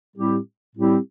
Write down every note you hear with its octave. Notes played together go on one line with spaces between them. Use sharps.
A2 G3 C4 E4 G4
A2 G3 C4 E4 G4